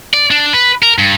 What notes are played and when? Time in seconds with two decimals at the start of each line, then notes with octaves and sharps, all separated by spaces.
0.14 D5
0.31 D4
0.53 B4
0.83 A#4
0.98 G2